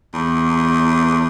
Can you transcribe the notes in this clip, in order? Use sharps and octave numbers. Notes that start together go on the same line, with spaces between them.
E2